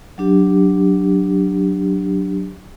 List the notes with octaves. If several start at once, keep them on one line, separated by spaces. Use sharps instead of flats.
F#3 D4 G4